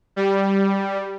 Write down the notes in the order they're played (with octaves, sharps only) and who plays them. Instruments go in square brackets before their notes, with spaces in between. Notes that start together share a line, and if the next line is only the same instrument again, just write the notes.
[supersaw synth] G3